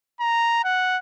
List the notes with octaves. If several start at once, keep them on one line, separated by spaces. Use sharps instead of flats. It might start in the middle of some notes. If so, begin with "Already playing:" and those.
A#5
F#5